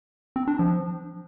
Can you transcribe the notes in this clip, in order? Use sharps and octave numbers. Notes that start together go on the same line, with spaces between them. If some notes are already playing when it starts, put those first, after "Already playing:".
C4
D4
F3